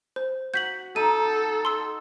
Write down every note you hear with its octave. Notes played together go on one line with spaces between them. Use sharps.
C5
F#4 G6 B6 F#7
D#4 A4 D#7
C6 E6